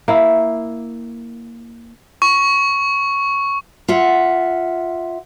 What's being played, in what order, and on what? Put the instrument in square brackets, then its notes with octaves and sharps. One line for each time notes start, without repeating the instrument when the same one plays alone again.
[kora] A#3 E4
[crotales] C#6
[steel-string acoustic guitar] F4 E5 F#5